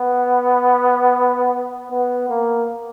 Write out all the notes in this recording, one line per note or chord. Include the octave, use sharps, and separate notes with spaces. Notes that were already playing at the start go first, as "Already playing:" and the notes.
Already playing: B3
B3
A#3